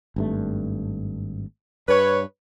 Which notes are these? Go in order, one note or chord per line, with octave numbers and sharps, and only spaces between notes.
G#1 G2 A3
G2 B4 C#5